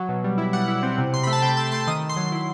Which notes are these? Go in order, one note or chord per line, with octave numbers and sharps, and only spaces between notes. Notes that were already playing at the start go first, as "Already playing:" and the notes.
Already playing: F#3
B2
G3
E4
G3 F#5
E4
C4
C3
C3 C6
A3 B5
A5
C3 G5
A3 A5
A3 C6
D#3 D#6
D#3
C6
F#3
E4